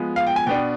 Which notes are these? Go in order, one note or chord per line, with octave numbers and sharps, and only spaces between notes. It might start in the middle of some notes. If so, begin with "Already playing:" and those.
Already playing: F3 G#3 B3
F5
G5
G#5
B2 B3 D4 G5